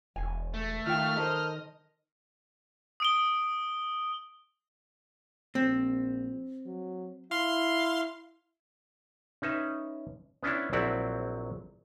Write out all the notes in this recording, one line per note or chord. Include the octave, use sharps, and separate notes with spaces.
E1 G#5
A3
D#3 F4 F5 G5 F6
A4 A#4 C5 D#5
D#6 D7 G7
A#1 C4
F#3
E4 F5 C6
C#4 D#4 B4 E5
B3 C#4 D4 E4
A#1 F#3 C4 E4 D5 F#5